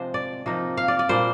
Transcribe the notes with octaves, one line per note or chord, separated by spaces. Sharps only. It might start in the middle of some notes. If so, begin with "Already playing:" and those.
Already playing: C3 F3 G#3 D4 C5
D5
C3 F3 A#3 D#4
F5
D5
D5
A#2 G3 A#3 D4 C5